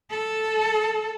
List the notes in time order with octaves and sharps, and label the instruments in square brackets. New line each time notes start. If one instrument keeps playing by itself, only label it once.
[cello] A4